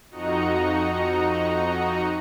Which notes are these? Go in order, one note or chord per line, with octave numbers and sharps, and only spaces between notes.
F2 D#4 F#4 D#5 A#5 C#7